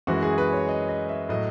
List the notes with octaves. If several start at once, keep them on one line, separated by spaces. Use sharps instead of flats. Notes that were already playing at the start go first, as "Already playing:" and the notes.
F#2 E3 G#3 F#4
G#4
B4
C#5
D#5
D#5
E5
A2 F#3 D#5